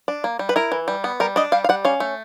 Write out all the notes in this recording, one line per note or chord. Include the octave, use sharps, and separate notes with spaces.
D4
A#3
G3
B4
E4 A#4
E3
G3
B3
G3 A#4
D4 D#5
G3 F5
F5
G3 F#5
C#4 F5
A3